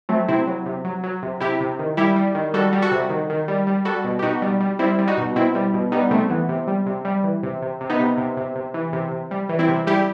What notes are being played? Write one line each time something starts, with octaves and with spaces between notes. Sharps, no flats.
F#3 A3 C4
C3 C4 E4
F#3
C3
F#3
F#3
C3
C3 E4 G4
C3
D#3
G3 E4 G4
G3
D#3
G3 F#4 A4
G3
F#4 A4
C3
D#3
D#3
G3
G3
G3 F#4 A4
B2
G4
B2 D#4 F#4
G3
G3
G3 C4 E4
G3
D#4 F#4
B2
B2 C4 E4
G3
B2
G3 B3 D#4
C3 A3 C4
E3 B3
C3
G3
C3
G3
E3
C3
C3
C3
B3 D#4
C3
C3
C3
C3
E3
C3
C3
G3
E3
C4 E4
C3
G3 E4 G4